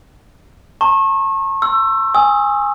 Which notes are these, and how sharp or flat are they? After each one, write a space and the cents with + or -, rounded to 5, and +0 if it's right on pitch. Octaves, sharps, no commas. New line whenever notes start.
A5 +35 C#6 -35
C6 +0 E6 +20
G#5 -15 D#6 +40